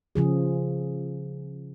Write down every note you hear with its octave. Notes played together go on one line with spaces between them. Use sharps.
C#3 F3 G#4